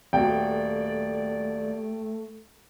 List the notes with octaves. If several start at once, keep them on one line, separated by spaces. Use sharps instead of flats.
D#1 A3 F#4 D5 G5